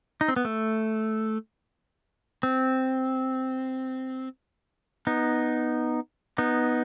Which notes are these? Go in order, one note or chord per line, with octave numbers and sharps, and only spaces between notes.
D#4
C4
B3
A3
C4
B3 D#4
B3 D#4